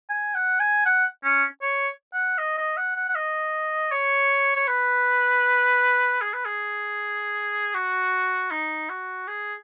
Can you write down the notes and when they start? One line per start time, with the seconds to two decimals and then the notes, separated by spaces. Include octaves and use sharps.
0.09 G#5
0.35 F#5
0.60 G#5
0.85 F#5
1.24 C#4
1.62 C#5
2.13 F#5
2.38 D#5
2.58 D#5
2.77 F#5
2.96 F#5
3.09 F#5
3.15 D#5
3.91 C#5
4.56 C#5
4.68 B4
6.21 G#4
6.34 B4
6.45 G#4
7.75 F#4
8.51 D#4
8.89 F#4
9.28 G#4